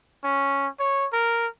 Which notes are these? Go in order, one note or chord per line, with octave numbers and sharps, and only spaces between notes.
C#4
C#5
A#4